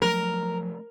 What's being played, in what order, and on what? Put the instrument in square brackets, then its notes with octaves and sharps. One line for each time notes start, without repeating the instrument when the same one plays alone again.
[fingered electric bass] F3 F#3 A3 [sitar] A#4